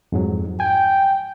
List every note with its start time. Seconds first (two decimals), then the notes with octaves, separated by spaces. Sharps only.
0.12 F2 G#2 F#3
0.60 G5 G#5